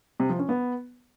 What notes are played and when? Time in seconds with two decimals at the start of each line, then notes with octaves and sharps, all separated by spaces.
0.20 C3
0.29 F3
0.39 C#4
0.49 B3